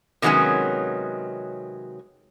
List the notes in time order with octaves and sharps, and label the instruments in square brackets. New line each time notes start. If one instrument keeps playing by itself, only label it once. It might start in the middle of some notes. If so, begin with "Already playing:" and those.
[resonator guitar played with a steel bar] C3 D#3 F#3 G#3 B3 C#4